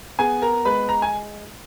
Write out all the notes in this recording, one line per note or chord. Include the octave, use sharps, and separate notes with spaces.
B3 G#4 G#5
A#4 A#5
G#3 B4 B5
A#5
G#5